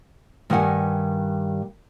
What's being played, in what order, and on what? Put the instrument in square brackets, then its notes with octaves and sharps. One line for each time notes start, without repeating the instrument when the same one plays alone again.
[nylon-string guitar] G2 D#3 G3 F#5 G#5